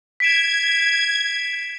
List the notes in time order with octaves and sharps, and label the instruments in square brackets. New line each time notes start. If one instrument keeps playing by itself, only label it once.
[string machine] G#6 [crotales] B6 D7 E7